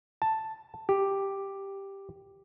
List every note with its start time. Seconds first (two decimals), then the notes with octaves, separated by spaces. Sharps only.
0.22 A5
0.89 G4